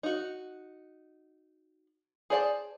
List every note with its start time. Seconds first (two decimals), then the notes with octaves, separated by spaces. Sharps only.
0.03 D#4 F#4
2.30 G#4 C5 D5 F5 A5